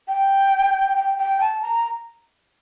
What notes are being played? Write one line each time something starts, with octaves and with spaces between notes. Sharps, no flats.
G5
G5
G5
A5
A#5